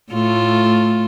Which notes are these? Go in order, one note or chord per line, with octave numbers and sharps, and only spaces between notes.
A2 A3 F4